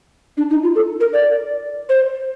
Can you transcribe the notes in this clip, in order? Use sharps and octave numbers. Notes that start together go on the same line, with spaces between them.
D4
D#4
F4
A4
A#4
D5
C5